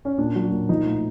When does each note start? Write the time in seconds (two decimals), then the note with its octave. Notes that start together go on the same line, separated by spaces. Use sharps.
0.05 C#4
0.18 A#2 D4
0.36 F#3
0.52 A#2
0.69 F3 D#4
0.86 A2